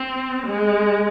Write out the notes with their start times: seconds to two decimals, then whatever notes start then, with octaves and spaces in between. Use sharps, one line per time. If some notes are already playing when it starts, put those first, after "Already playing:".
Already playing: C4
0.46 G#3